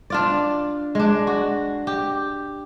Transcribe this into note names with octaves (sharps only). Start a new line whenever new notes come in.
D4 F4 D5
G#3 D4
F#4
G4